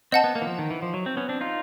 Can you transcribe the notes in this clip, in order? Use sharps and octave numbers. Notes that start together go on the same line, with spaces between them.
C4 D#5 F#5 A5
B3
A#3
E3
F3
D#3
E3
F3
F#3
C4
B3 C#4
C4 D4
D#4 F4